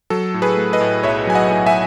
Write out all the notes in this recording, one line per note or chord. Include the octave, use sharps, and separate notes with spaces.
F#3 A4
A2
G#4 B4
A3
B4 D#5
A2
B1 C#5 E5
F#3 G#5
D#5 F#5
A2
E5 G#5